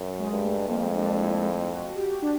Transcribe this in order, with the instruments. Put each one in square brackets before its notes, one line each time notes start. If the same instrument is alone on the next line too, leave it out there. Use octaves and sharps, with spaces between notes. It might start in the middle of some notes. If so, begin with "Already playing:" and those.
Already playing: [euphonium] F#2
[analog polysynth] G#3
[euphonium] G2
[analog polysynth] A3
[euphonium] F2 [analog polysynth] A#3
[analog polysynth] D4
E4
E4
F#4
G4
D4